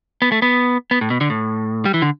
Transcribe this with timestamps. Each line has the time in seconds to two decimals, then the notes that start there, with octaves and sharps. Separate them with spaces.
0.22 B3
0.32 A3
0.42 B3
0.91 B3
1.01 A2
1.10 B2
1.21 D3
1.30 A2
1.85 G3
1.94 E3
2.02 D3